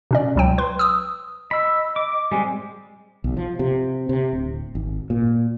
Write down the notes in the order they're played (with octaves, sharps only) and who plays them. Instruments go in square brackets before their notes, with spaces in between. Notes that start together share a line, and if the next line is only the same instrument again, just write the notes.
[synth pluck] B2 C#4 D5
C#2 F#3 G5
B4 C6
D#6 E6
[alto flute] D#5 [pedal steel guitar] B5 E6
[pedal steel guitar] D6
[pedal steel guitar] G3 G#3 C4 [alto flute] G#5
[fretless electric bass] B1
F3
C3
C3
D1
G#1
A#2